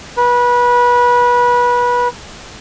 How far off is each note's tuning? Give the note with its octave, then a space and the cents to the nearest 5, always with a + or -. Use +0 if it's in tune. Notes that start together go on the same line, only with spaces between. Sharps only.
B4 -25